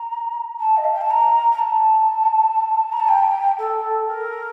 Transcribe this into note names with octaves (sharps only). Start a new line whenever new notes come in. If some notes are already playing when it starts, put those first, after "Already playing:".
Already playing: A#5
A5
D#5
F5
G5
A5
A#5
A#5
A5
A#5
A5
G5
A4
A#4